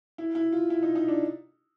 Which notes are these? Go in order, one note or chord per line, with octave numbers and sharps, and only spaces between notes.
E4
E4
F4
E4
D#4
D#4
D4